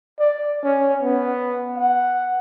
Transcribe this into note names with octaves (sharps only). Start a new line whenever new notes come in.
D5
C#4
B3
F#5